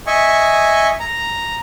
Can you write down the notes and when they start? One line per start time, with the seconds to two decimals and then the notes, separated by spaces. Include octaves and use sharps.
0.07 D#5 E5 G#5 C#6
1.00 A#5